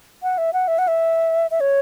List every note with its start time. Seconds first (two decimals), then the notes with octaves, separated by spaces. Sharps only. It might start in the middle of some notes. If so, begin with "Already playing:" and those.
0.23 F#5
0.38 E5
0.53 F#5
0.68 E5
0.78 F#5
0.88 E5
1.51 E5
1.60 C#5